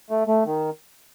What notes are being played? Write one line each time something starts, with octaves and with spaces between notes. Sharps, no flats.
A3
A3
D#3